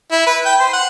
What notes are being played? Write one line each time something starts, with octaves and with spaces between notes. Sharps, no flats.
E4
B4
G5
C5
F#5